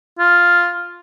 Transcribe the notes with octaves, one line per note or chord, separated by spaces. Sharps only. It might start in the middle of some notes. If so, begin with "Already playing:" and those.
F4